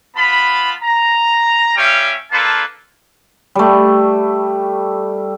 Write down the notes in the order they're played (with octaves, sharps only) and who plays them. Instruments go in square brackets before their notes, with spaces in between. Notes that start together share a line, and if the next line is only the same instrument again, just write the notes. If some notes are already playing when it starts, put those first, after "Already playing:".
[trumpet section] B3 F4 A5 B5
A#5
G3 C#4 C#5 E5 F5 G5
A#3 D4 F4 A4 B4 A5
[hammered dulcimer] G3 A3